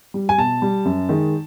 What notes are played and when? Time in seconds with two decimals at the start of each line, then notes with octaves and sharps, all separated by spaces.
0.14 G3
0.29 G#5
0.38 B2 A5
0.62 G3
0.85 F#2
1.09 D#3 G#3